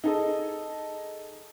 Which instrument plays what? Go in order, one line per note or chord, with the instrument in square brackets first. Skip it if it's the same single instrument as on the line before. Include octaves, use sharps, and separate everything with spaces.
[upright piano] D#4 G#4 A4 D#5